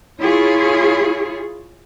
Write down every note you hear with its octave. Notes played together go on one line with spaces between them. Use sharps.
E4 F4 G#4 C#5